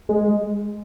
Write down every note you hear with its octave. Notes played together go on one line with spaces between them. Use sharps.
G#3